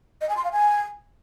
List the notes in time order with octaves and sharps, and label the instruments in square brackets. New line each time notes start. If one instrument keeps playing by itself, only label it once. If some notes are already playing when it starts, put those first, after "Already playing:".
[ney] D#5
G#5
C6
F5
G#5